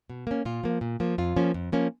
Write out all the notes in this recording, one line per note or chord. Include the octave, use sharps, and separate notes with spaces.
B2
A#3 C#4
A#2 F4
F3 A#3
A#2
F3 A#3
F2 F4
F3 A#3 C#4
F2
F3 A#3 C#4